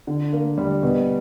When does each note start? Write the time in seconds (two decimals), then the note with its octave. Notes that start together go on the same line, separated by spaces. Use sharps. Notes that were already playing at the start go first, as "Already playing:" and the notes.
0.07 D3
0.33 A#3
0.58 G3
0.83 B2